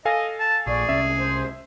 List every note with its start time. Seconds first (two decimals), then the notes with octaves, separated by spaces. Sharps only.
0.05 A4 D#5 F5 G#5
0.40 A5
0.67 A#1 G#4 D5 C#6
0.89 C2 C#4 E5
1.18 C5